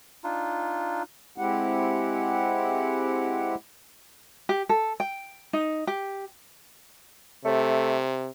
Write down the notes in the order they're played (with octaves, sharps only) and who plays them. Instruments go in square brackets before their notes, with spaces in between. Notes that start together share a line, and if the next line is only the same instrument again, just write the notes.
[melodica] D4 D#4 F4
[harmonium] G#3 C4 E4 G4 F#5
[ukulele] G4
A4
G5
D#4
G4
[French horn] C3 [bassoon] A3